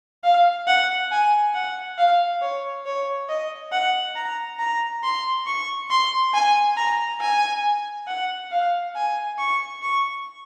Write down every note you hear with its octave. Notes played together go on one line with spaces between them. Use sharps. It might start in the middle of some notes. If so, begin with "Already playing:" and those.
F5
F#5
G#5
F#5
F5
C#5
C#5
D#5
F#5
A#5
A#5
C6
C#6
C6
G#5
A#5
G#5
F#5
F5
G#5
C#6
C#6